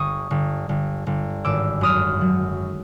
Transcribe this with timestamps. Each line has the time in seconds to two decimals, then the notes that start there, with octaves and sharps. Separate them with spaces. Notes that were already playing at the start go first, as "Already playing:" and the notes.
Already playing: G1 C#6 D#6
0.31 G1
0.69 G1
1.07 G1
1.45 G#1 D6 E6
1.81 F#2 D#6 F6
2.21 F#3